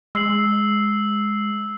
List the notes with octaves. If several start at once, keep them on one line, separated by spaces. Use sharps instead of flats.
G#3 E6 C7 F#7